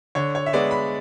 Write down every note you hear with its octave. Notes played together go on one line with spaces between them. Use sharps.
D3 C#5
C#5
E5
G#3 B3 D5
B5